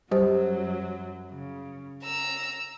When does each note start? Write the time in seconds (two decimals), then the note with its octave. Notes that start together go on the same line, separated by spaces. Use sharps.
0.11 F#2 F#3 G3 G4 C5
1.30 C#3
2.03 A#5 E6